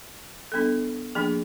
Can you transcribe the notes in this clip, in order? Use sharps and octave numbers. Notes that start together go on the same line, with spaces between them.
G3 B3 D4 A4
F3 A#3 D4 G#4